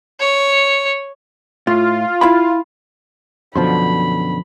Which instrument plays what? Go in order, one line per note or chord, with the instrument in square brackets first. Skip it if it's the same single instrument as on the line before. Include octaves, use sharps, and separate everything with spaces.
[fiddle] C#5
[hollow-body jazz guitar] A2 [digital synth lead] F4
[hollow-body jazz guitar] E4 F5 B5
[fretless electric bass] F#2 B2 D3 [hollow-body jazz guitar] F3 C5 C6 [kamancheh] B5